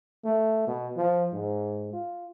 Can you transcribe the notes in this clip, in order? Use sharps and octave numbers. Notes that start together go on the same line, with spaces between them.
A3
B2
F3
G#2
F4